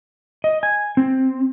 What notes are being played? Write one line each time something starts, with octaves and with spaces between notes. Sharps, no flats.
D#5
G#5
C4